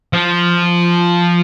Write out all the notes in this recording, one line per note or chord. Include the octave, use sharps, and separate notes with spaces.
F3